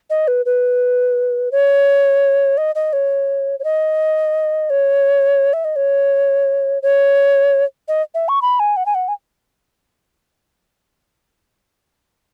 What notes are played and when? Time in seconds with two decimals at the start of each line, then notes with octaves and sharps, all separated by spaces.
0.10 D#5
0.28 B4
0.46 B4
1.52 C#5
2.57 D#5
2.75 D#5
2.93 C#5
3.59 C#5
3.64 D#5
4.70 C#5
5.53 E5
5.65 D#5
5.76 C#5
6.82 C#5
7.88 D#5
8.15 E5
8.29 C#6
8.42 B5
8.60 G#5
8.77 F#5
8.86 G#5
8.95 F#5
9.08 G#5